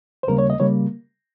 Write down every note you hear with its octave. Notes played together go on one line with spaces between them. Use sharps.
C5
D#2 C#3 G3 A#3 A#4
C#5
D#5
C#3 G3 A#3 C#5